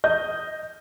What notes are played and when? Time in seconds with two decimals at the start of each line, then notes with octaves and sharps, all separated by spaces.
0.04 D#5 G6